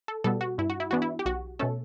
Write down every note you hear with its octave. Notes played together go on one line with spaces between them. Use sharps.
A4
B2 G3 B3 A4
F#4
G2 E4
F#4
E4
E3 B3 D4 F#4
E4
G4
B1 F#4
B2 A3 C#4 A4